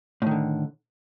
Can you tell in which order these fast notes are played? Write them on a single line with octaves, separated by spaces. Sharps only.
A2 D#3 D3